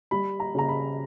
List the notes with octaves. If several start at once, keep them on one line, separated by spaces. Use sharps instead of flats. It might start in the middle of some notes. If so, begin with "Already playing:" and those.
G3 B5
A#5
C#3 A#5
B5